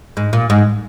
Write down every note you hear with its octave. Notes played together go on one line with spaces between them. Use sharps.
G#2
A#2
G#2